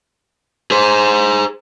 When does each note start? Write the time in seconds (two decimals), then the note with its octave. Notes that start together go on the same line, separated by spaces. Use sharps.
0.71 G#4 C5